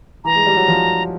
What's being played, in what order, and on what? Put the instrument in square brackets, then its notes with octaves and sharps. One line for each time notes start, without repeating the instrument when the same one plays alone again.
[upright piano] E3 [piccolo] A#5
[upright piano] G#3
G3
F#3
F3